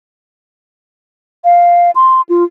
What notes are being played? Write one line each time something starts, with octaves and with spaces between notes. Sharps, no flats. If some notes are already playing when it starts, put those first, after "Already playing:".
F5
C6
F4